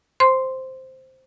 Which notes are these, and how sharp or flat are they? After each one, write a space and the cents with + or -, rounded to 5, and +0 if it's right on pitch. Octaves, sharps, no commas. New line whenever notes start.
C5 +0 C6 -5